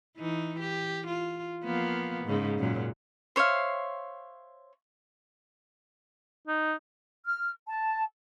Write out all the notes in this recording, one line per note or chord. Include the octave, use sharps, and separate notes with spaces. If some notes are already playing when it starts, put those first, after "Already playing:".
E3 D#4
G4
F4
F3 A#3 B3
G#2 C#3
F#2 A#2 F#3
C5 C#5 E5 F5
D#4
F6
A5